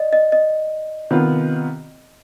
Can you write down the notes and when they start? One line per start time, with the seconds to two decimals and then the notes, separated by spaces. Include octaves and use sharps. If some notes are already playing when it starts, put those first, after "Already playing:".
Already playing: D5 D#5
0.13 D#5
0.32 D#5
1.11 C3 D#3 B3 F4